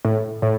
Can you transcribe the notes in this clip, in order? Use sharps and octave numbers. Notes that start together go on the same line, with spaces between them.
A2
A2